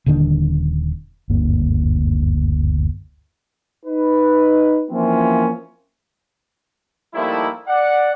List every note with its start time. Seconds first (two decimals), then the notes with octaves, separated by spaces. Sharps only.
0.06 D#1 D3 D#3 D4
1.29 F#1 D2 G2 A#3
3.86 D#4 B4
4.90 E3 F3 A#3 C4 C#4 F4
7.14 F3 G3 A3 A#3 D#4 E4
7.68 D5 F#5